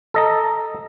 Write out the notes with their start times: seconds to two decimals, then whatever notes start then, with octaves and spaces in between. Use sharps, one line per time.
0.14 A4 D#5 A#5